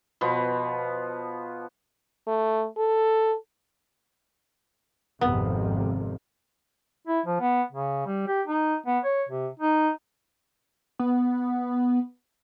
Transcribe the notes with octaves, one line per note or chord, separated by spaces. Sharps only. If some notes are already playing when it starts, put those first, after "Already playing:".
B2 F3 B3
A3
A4
G#1 F2 C3 B3
E4
F3
B3
C#3
G3
G4
D#4
B3
C#5
C3
D#4
B3